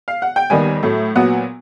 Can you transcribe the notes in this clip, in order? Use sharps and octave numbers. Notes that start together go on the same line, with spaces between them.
F5
F#5
G5
D#2 D#3 G3 B3 G#5
A2 F#3 A3
A#2 F#3 B3 F#5